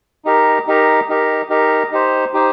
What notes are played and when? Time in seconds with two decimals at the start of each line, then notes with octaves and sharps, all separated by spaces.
0.25 D#4 G4 A#4
0.67 D#4 G4 A#4
1.09 D#4 G4 A#4
1.50 D#4 G4 A#4
1.92 D#4 G4 C5
2.34 D#4 G4 C5